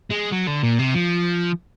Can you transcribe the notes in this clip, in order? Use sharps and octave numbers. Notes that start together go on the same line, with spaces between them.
G#3
F#3
D3
A#2
C3
F3